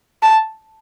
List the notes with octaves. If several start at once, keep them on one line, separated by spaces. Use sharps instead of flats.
A5